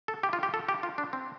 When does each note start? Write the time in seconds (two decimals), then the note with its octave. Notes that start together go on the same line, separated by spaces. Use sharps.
0.08 A4
0.23 G4
0.33 F4
0.43 G4
0.54 A4
0.68 G4
0.83 F4
0.98 D4
1.13 C4